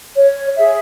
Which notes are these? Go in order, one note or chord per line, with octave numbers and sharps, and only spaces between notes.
C#5
G#4 E5